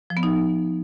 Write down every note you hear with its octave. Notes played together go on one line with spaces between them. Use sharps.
F3
B3
D#4